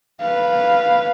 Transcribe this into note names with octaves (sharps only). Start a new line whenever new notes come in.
B4 F5